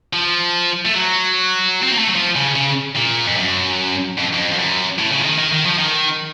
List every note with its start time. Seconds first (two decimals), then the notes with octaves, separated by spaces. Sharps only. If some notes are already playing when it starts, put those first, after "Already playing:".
0.13 F3
0.85 A3
0.94 F#3
1.83 C4
1.91 A#3
1.99 A3
2.07 F#3
2.15 F3
2.36 C#3
2.56 C#3
2.96 A#2
3.27 F2
3.37 F#2
4.18 F2
4.33 F2
4.52 F2
4.58 F#2
4.98 A2
5.12 C#3
5.20 F3
5.25 D#3
5.38 D#3
5.53 D#3
5.66 F3
5.79 D#3